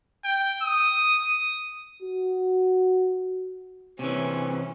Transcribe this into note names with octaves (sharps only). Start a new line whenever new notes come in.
G5
D#6
F#4
C3 E3 C#4